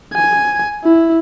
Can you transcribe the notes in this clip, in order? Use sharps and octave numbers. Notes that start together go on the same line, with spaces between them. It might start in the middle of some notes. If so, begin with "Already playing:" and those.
G#5
E4